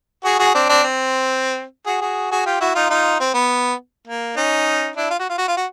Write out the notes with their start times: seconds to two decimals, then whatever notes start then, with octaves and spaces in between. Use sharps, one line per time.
0.24 F#4 G#4
0.39 F#4 G#4
0.54 C4 D4
0.69 C4 D4
0.83 C4
1.86 F#4 G#4
2.01 F#4 G#4
2.31 F#4 G#4
2.46 F4 G4
2.60 E4 F#4
2.75 D#4 F4
2.90 D#4 F4
3.20 C4
3.34 B3
4.07 A#3
4.37 C#4 D#4
4.96 D4 E4
5.10 F4
5.20 F#4
5.29 F4
5.38 F#4
5.48 F4
5.57 F#4